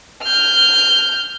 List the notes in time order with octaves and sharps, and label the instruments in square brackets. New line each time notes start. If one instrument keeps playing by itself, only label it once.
[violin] F6 G6